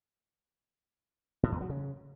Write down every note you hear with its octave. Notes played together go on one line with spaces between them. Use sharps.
A2
E2
F#3
C#3